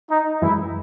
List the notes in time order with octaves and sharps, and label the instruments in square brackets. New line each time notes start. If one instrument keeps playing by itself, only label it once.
[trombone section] D#4
[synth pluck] F#2 E3 G#3 [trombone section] E4